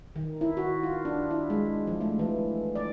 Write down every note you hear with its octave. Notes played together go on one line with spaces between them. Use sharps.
D#3
E4
F#4
F4
D4
E4
G#3
F3
A3
E3
D5